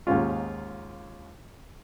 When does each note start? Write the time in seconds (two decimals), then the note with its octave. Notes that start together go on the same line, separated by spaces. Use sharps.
0.07 D#2 G#2 C#4 F4